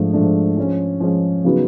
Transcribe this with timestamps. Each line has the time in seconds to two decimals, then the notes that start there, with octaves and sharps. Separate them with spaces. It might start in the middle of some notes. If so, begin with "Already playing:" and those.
Already playing: G#2 F3 A3 D4
0.13 G#2 F3 A3 D4
0.57 F3 G#3 C#4
1.00 F3 G#3 C#4
1.44 C#3 F#3 B3 D#4 F#4